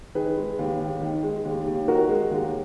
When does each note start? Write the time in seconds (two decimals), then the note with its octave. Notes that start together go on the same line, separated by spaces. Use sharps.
0.15 D#3 G#4 B4
0.36 G#3
0.59 D#2
0.80 D#2
1.01 D#3
1.23 G#3
1.45 D#2
1.66 D#2
1.87 D#3 F#4 A#4
2.09 G#3
2.31 D#2